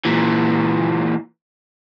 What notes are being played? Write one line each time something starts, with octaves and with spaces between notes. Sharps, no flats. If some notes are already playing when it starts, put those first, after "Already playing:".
A#2 E3